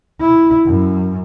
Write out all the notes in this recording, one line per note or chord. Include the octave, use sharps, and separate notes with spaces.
E4
F#2